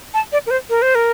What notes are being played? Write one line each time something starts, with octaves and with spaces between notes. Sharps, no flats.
A5
D5
A#4
C5
A#4
C5
A#4